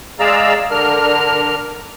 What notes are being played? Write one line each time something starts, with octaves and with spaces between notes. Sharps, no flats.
G#3 G#4 D5 F5 A#5 E6
D3 D4 A#4 F6